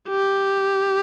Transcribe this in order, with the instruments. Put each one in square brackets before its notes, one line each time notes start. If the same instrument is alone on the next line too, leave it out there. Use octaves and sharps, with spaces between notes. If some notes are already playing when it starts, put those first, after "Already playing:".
[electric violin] G4